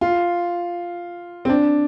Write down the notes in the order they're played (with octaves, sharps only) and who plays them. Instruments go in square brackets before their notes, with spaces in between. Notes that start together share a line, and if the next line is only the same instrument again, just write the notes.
[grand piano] F4
C4
D4